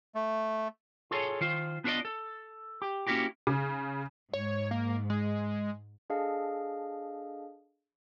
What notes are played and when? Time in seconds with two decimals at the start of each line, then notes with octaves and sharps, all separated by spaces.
0.15 A3
1.11 F4 G#4 A4 C#5
1.41 D#3 F4 C5
1.84 B3 D4 F4 A4 D5 D#5
2.05 A4
2.82 G4
3.07 A#3 C#4 E4 F#4 G4
3.47 C#3
4.33 G#2 C#5
4.71 A#3
5.10 G#3
6.10 D4 G#4 A4 D#5 F5 A5